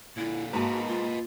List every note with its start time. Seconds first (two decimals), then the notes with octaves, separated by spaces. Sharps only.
0.17 A#2 D3 E4
0.53 G#2 A#3 F#4 B4 D#5 A5
0.88 F4